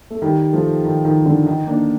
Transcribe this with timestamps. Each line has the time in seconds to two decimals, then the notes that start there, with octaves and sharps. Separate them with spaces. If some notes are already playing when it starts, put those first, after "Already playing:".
0.10 A3
0.22 D#3 G3
0.53 F3 A3
0.85 D#3
1.05 D#3
1.26 D3
1.46 D#3
1.67 A#3 D4